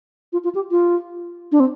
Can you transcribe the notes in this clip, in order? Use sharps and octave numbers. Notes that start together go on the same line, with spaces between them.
F4
F4
G4
F4
D4
C4